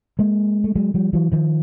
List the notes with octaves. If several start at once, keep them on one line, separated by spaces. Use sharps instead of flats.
G#3 A#3
A3
F#3 G#3
F3 G3
E3 F#3
D#3 F3